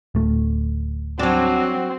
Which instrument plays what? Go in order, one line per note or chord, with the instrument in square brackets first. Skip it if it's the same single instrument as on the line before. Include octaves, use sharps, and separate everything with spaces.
[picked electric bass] D1 A3
[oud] F#3 D4 [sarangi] C4 [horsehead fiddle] F#4